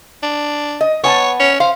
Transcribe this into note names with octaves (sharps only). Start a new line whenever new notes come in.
D4
D#5
B3 C#5 G#5 A5
C#4
C5 F5